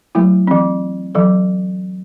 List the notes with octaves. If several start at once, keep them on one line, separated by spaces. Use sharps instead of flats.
F#3 A3 E4
E3 C4
E3 F#3 A4